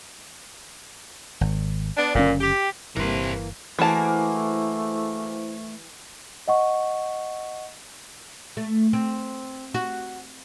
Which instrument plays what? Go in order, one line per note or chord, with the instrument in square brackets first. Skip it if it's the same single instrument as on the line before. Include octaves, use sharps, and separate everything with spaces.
[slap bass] G#1
[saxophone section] B3 D4
[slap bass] F#1 D3 C#4 [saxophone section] F#2 A#2
[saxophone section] G4
[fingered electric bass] G1 G3 [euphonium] C3 [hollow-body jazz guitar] E3 A#3 [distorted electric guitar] A#4 C5
[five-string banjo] E3 A5 [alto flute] A3 [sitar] A#3 F#4 G#4 [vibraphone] E4 C5
[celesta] D#5 F#5 C#6
[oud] A3
C4
F#4